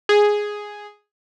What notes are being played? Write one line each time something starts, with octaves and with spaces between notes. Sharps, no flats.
G#4